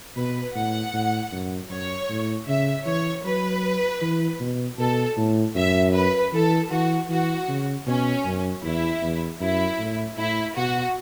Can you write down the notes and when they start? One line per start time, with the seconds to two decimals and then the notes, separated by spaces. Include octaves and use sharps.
0.17 B2 B4
0.55 A2 F#5
0.93 A2
1.32 F#2
1.70 F#2 C#5
2.10 A2
2.47 C#3 E5
2.86 E3 C#5
3.25 F#3 B4
4.02 E3
4.40 B2
4.79 B2 A4
5.17 A2
5.56 F#2 E5
5.94 B4
6.32 E3 A4
6.71 E3 F#4
7.09 E3 F#4
7.49 C#3
7.87 B2 C#4
8.25 F#2
8.64 E2 E4
9.03 E2
9.41 F#2 E4
9.79 A2
10.17 A2 E4
10.56 B2 F#4